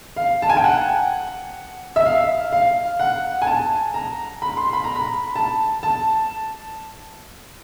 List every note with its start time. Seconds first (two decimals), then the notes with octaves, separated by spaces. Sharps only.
0.16 F5
0.42 A5
0.49 G#5
0.57 G5
0.64 F#5
1.96 E5
2.06 F5
2.53 F5
2.99 F#5
3.42 G#5
3.47 A5
3.94 A#5
4.42 B5
4.57 C6
4.73 B5
4.84 A#5
4.96 B5
5.35 A5
5.83 A5